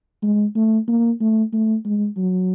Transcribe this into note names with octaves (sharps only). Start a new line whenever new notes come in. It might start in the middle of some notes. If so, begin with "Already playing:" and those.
G#3
A3
A#3
A3
A3
G#3
F#3